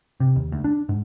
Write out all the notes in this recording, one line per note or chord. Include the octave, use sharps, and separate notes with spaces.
C3
D#2
D2
D4
G#2